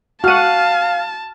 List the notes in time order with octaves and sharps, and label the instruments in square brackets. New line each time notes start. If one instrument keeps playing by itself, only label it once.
[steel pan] F#4 F#5 [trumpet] F5 [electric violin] A5 [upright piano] F6 D#7